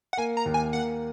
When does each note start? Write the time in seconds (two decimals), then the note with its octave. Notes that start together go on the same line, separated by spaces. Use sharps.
0.13 F#5
0.17 A#3 G#5
0.37 A#5
0.46 D#2
0.54 G#5
0.73 A#3 F#5